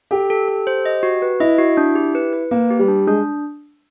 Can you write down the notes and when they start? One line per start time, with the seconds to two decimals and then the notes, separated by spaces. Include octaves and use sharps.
0.11 G4 A4
0.30 A4
0.48 A4
0.67 C5
0.85 D#5
1.03 F#4
1.22 B4
1.40 E4 D#5
1.58 F#4
1.77 D4
1.95 G4
2.15 B4
2.33 B4
2.51 A#3 B4
2.70 G4
2.79 G3
2.88 D4
3.07 G#3 D4